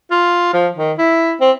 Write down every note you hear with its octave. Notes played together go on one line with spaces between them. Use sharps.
F4
F3
D#3
E4
C4